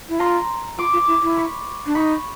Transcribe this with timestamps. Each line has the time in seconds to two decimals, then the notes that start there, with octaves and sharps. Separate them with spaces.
0.09 E4
0.19 F4 A#5 C6
0.78 F4 C6 D6
0.93 F4
1.08 E4
1.22 E4
1.37 B5 C#6
1.86 D4
1.95 D#4 B5 C#6